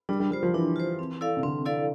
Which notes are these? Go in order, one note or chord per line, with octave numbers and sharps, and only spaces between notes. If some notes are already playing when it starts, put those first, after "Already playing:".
G3 D4
G3
G3 F4 C5
F3
E3 D4
F4 C5
C4
E4 A4 D5 F5
C3
D3 C4
E4 A4 D5 F5